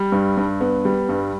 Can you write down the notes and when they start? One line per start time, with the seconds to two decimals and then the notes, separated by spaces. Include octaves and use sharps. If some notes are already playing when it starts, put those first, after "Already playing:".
Already playing: G3
0.12 G2
0.37 G2
0.60 B3
0.85 G3
1.09 G2